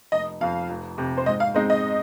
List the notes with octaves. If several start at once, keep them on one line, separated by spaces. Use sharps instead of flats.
F1 D#5
F2 F3 F5
F1
F2 C3
C5
G#2 D#5
F5
G#3 C4 D#4 C5 D#5
D#5